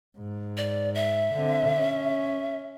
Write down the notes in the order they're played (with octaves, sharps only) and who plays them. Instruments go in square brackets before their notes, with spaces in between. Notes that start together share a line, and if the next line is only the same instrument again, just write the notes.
[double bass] G#2
[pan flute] D5
E5
[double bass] D3 C4
C#4